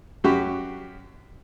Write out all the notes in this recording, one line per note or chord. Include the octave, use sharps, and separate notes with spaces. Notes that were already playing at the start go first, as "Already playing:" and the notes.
F#2 F#4 G4